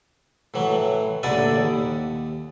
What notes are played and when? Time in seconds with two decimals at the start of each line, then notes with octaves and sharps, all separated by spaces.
0.54 A2 E3 F#3
1.23 A1 A#2 D3 E4 D5 G#5
1.56 D#2